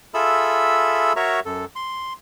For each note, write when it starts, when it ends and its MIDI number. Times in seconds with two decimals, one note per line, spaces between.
0.14 1.13 65
0.14 1.13 68
0.14 1.13 69
0.14 1.13 76
0.14 1.13 83
0.14 1.13 88
1.16 1.40 66
1.16 1.40 70
1.16 1.40 73
1.16 1.40 76
1.16 1.40 82
1.16 1.40 85
1.45 1.65 42
1.45 1.65 69
1.76 2.13 84